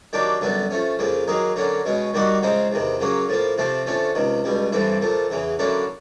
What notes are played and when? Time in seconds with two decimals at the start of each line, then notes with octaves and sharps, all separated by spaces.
0.13 D#3 F#3 A#3 D4 G4
0.41 F#2 D3 G3 B3
0.71 F3 A3 C#4
0.99 F2 C#3 F3 A#3
1.28 D#3 F#3 A#3 D#4 G#4
1.56 D3 F#3 A#3 C#4
1.85 B2 G#3 C#4
2.14 D#3 G3 A#3 D#4 F#4
2.42 C#3 F3 G#3 C4 D#4
2.72 E2 C3 D#3
3.00 C#3 F#3 A#3 C#4
3.29 A2 F3 A#3
3.58 C3 F3 A3 C4
3.87 D3 F3 A3 C#4
4.15 C#2 C3 D#3
4.44 C#2 B2 G3
4.72 G2 E3 A3 C4 E4
5.02 A#2 F3 A3
5.30 E2 C#3 E3
5.59 D3 F#3 A#3 C#4 E4